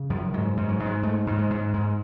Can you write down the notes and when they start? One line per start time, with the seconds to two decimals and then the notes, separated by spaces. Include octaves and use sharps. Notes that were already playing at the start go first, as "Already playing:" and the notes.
Already playing: C#3
0.10 F#2 F3
0.34 G#2 F#3
0.57 G#2
0.69 F#3
0.80 G#2
0.86 G#3
1.03 G#2 A3
1.27 G#2
1.38 G#3
1.50 G#2
1.74 G#2 G#3